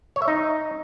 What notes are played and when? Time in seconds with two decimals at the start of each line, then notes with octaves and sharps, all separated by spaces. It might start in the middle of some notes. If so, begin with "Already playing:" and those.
0.16 C#5
0.22 E5
0.28 D#4